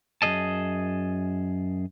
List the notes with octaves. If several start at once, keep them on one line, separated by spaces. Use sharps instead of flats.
F#2 B2 G#4 D#5 A5